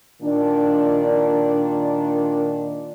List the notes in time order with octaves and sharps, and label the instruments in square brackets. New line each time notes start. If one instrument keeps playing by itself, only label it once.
[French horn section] A#2 D#3 D4